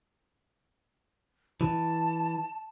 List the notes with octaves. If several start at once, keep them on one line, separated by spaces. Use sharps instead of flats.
E3 A5